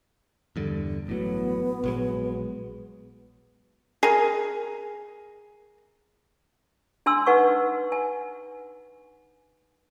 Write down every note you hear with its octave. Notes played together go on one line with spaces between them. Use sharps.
E2 G2 D3
A1 A2 F#3 B3
A#1 F#3 G#3
G#4 A#4
D4 G#5 C6 E6
D#4 B4 F#5 G#5 C#6
G#5